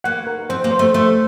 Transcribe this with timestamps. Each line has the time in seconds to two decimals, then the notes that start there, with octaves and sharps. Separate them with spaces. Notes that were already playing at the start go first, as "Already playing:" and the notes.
0.04 A#3 F#5
0.27 A#4
0.49 C4 C5
0.64 A#3
0.71 C5
0.79 A3
0.94 A3 C5